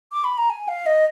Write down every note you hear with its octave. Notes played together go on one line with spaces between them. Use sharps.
D6
B5
A#5
G#5
F5
D#5